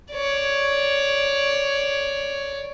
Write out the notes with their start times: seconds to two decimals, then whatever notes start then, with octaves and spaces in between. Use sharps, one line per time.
0.11 C#5 D5